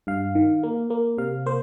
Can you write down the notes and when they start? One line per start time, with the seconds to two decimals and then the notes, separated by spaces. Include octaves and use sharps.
0.07 G2 F5
0.35 D#3
0.63 A#3
0.90 A#3
1.18 C3 F5
1.46 A#3 C5